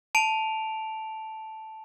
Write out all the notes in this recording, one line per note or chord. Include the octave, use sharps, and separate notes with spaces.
A5 D7 F7